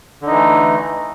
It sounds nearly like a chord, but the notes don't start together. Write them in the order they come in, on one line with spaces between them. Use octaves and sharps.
D3 D#4 E3 A3